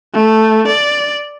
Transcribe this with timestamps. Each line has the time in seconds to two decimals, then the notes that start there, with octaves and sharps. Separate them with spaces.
0.14 A3
0.68 D5